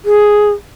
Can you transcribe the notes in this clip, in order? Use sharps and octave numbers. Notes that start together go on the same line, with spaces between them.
G#4